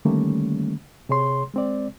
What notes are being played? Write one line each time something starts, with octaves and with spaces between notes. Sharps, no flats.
D3 D#3 G3 A3 A#3 C#4
C3 G#4 C#5 C6
G#3 C4 D5